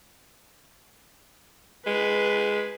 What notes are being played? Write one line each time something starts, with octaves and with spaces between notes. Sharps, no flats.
G#3 B4